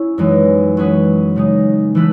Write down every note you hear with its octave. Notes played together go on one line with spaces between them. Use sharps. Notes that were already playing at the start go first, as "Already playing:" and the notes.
Already playing: C#4 E4
F#2 E3 G#3 D#4
F#3 C#4 G#4 B4
C#3 G#3 D#4
E3 A3 E4 B4